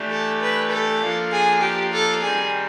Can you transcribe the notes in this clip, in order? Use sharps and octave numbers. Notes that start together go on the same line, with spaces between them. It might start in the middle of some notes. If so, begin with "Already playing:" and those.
Already playing: E3 A3 D4 G4
A4
B4
A4
F3 A#3 D4 F4
G#4
G4
A4
D#3 G3 C4 G#4